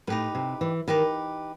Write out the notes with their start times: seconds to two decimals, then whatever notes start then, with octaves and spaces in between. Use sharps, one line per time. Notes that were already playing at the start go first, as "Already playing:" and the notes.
0.07 A2 D#4 G4 B4
0.35 C3
0.61 E3
0.88 D#3 D#4 G4 B4